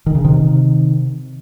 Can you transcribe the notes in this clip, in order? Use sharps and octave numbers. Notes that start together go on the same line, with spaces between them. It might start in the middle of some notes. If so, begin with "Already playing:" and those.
D#3
C#3
C3 D#3